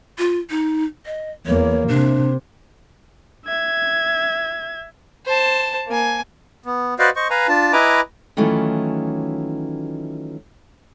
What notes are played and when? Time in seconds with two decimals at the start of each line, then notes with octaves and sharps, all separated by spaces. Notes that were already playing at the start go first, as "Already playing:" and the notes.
0.18 F4
0.50 D#4
1.06 D#5
1.46 E2 A#3 C#5
1.89 C3 D4
3.47 E5 G#6
5.26 C5 A5
5.87 A#3 G#5
6.66 B3
6.99 F#4 B4 C5 D5 D#5 F5
7.16 C5 D#5 C#6
7.30 B4 F5 G#5 A#5
7.48 D4 F4 A5
7.73 E4 B4 D#5 G#5 A#5 D6
8.37 D#3 E3 F#3 A3 C#4 F4